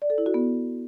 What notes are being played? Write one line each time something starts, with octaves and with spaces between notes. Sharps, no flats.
D5
A4
E4
F#4
B3